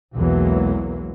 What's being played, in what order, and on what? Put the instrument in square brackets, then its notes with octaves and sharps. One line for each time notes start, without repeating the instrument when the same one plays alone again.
[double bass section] B1 E2 E3 F#3 G#3 A#3